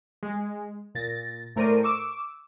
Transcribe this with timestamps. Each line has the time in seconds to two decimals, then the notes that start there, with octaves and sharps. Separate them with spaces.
0.23 G#3
0.95 A#2 A6 A#6
1.56 A2 A3 A#4 C5 D5 D#7
1.83 C#6 D6 E6